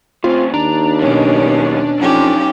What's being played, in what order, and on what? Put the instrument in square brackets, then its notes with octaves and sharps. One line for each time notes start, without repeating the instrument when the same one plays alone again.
[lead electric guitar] A2 C#3 [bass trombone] C4 [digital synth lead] F4
[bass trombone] D#2 [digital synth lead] D4 [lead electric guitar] A#5
[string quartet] B2 C#4 [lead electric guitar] D3 F#3
[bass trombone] F2 [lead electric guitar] F#3 D#4 [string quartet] C#4 G4